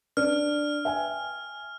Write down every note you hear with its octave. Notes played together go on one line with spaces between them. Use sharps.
D4 F6
E5 G5 G#5